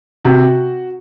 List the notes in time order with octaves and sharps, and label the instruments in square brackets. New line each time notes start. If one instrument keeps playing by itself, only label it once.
[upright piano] C3 F#4